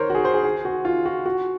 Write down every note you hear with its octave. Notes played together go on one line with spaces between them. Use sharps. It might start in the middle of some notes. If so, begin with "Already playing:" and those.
Already playing: A#4 C5 C#5
F#4
G#4
C5
G#4
G#4
F#4
F4
F#4
F#4